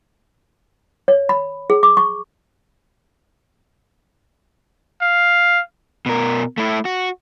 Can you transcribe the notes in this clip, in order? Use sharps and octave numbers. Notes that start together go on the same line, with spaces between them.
C#5
B5
G#4
D6
C#6
F5
B2 A#4
A3 E4
F#4